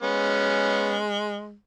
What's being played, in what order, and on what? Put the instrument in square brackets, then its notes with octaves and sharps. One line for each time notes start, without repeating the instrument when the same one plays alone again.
[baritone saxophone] G#3 [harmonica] B3 C#4